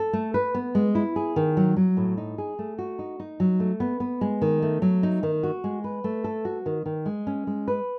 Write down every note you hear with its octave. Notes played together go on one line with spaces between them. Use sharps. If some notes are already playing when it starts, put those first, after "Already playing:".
Already playing: A4
A3
B4
B3
G#3
E4
G#4
D#3
F#3
F#3
A2
D#4
G#4
A3
F#4
D#4
D#4
F#3
A3
B3
B3
G#3
D#3
A3
F#3
D#4
D#3
F#4
G#3
B4
A3
A4
F#4
D#3
D#3
G#3
C#4
G#3
B4